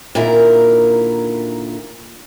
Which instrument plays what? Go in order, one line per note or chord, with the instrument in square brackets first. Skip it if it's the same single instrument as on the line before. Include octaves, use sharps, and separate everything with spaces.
[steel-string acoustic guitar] A#2 D3 D#3 E4 A#4